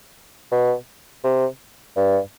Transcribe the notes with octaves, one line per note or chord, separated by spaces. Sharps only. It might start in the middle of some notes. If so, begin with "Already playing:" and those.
B2
C3
G2